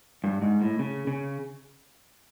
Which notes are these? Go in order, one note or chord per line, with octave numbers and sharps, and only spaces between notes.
G2
G#2
A2
C#3
C#3